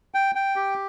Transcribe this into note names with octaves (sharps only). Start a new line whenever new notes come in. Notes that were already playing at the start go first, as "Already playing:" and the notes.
G5
G5
G4